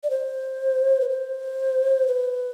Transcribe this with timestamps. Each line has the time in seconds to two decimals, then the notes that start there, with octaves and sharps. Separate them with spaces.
0.04 D5
0.10 C5
1.01 B4
1.09 C5
2.07 B4